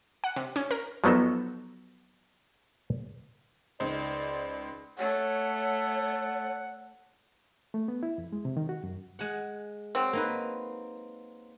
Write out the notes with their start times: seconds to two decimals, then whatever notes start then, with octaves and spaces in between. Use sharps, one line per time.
0.24 F#5
0.36 C3
0.56 C#4
0.71 A#4
1.04 F3 F#3 B3 D#4 A4
3.80 C#2 D#4 C5 D5
4.99 A3 C#5 F#5
7.74 A3
7.88 B3
8.03 E4
8.18 F2
8.33 G#3
8.45 C3
8.57 D#3
8.69 F#4
8.84 F#2
9.19 G#3 F#5
9.95 F#3 C4
10.13 A#3 D#4 B4